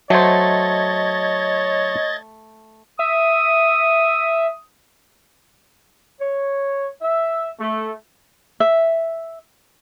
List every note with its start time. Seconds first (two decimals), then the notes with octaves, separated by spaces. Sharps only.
0.10 F#3 A3 C5 C#5 D#5 G#6 A6
2.99 E5 D#6
6.19 C#5
7.01 E5
7.58 A3
8.60 E5